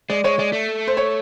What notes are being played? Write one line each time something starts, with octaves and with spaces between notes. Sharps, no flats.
G#3 D5
G#3 C#5
G#3 D5
A3
C5
C#5